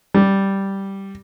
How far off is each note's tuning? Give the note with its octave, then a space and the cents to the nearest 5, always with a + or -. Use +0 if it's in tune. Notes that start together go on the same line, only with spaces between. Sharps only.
G3 -5